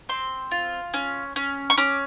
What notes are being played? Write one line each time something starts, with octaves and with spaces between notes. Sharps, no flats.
C4 C6
F4
C#4
C#4
C#6
C#4 D6